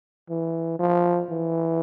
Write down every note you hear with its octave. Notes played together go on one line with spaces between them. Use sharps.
E3
F3
E3